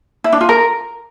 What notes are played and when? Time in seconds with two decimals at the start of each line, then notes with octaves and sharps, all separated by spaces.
0.24 E4
0.32 D4
0.41 F4
0.49 A#4